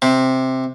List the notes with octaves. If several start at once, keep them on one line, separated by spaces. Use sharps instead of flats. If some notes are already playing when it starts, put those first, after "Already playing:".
C3